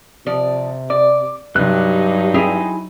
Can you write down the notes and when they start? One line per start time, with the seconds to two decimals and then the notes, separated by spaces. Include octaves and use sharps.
0.26 C3 F3 D5
0.90 D5 D6
1.56 G2 C3 F#3 D#4 G4 F#6
2.34 C4 E4 G4 G#4 G#5